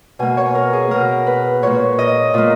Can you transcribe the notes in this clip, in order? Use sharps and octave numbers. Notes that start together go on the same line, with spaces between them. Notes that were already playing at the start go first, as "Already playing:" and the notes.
B2 A#3 G#5
C#5
A#4
G#4
B2 A#3 A#4
B4
A#2 A#3 C#5
D#5
A#2 A#3